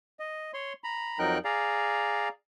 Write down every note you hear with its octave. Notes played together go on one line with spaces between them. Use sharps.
D#5
C#5 C6
A#5 B5
F2 F#3 D#4 A#4 G5 F#6
G#4 D5 F5 A#5